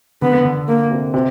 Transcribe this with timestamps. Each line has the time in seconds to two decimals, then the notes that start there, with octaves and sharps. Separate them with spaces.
0.22 D3 B3
0.45 D3
0.68 A#3
0.91 C3
1.14 C3